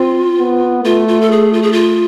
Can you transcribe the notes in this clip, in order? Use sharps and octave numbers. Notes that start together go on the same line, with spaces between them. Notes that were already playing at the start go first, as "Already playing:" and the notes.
Already playing: C4 F4
B3
A3 F4
F4
A4
G#4
F4
G#4
F4